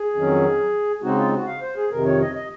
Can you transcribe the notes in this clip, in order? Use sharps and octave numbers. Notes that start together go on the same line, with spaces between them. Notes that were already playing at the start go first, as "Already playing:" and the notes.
Already playing: G#4
F2 D#3 F#3 C#4
C#3 G#3 C4 D#4 F#4
F4
F#4
F5
C5
G#4
F2 C3 D#3 A#4
C#5
D#5
D#5